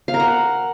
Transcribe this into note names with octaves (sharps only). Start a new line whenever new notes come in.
F5
A#4
F#5